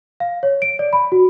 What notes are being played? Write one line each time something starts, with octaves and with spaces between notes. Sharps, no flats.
F5
C#5
D7
D5
B5
F#4